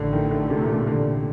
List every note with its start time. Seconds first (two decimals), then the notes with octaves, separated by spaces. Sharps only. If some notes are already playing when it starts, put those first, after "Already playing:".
Already playing: A1 A2 D3 A3
0.13 D#3
0.31 D3
0.50 C3
0.62 A#2
0.74 C3
0.87 D3